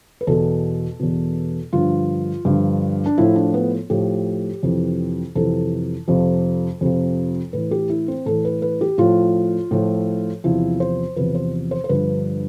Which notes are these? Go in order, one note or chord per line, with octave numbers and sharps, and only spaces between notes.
B4
E2 B2 A4
E2 B2
G2 D3 F3 F4
G2 D3 F3
D4
A2 F3 E4
D4
B3
A2 F3 G4
F2 C3 E3
F2 C3 E3 A4
F2 C3 F3
F2 C3 F3
A2 E3 B4
G4
E4
C4
A2 E3 A4
B4
B4
G4
A2 F3 F4
A2 F3
E2 C3 F3 E4
C5
E2 C3 F3 B4
C5
C5
C5
G2 D3 F3 B4